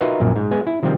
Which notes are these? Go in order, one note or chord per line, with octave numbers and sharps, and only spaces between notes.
D#4 F4 F#4 A#4 B4 E5
A#1 F#2 A#2
G#2
G#3 B3 G#5
E4
C3 D#3 F3 G3 C4